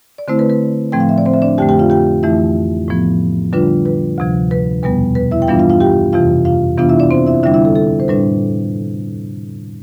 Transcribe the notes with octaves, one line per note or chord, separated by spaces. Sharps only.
D5
D3 A3 C4 E4 C5
B4
B4
A2 F3 A3 C4 G5
F5
E5
D5
C4 C5
E5
D4 D5
F2 D3 A3 G4 G5
G4 G5
F4 F5
G4 G5
F2 E3 A3 E4 E5
A2 F3 B3
D3 G3 D4 F4 B4
B4
D2 C3 F3
B4
E2 B2 G3 B3 B4
B4
E4 E5
G5
G2 E3 G3 B3 D4 F4 F5
F4 F5
F4 F5
G4 G5
F2 C3 E3 F4 F5
F4 F5
C3 E3 B3 D4 F4 F5
E4 E5
D4 D5
C4 C5
E4 E5
D3 G3 D4 E4 E5
E4 E5
A4
A4
C5
A2 G3 D4 B4